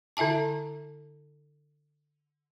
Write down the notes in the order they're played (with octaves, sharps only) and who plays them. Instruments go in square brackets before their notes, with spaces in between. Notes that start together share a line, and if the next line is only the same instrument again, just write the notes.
[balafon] D3 E4 E5 G#5 A5